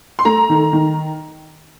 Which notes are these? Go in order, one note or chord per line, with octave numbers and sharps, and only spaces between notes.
C6
A3 A#5
D#3
D#3